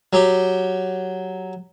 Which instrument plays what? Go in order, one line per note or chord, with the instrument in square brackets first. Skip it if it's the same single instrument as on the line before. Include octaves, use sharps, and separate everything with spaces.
[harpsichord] F#3 G4